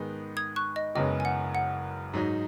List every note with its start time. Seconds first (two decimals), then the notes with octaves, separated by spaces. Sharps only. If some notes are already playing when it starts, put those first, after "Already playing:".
Already playing: G#2 D#3 G#3 B3 D#4
0.37 D#6 G#6
0.56 C#6 F#6
0.76 D#5
0.95 F#1 F#2 C#3 G#3 B3 D#5
1.20 G#5
1.25 F#5
1.55 F#5
2.13 G#2 F#3 D#4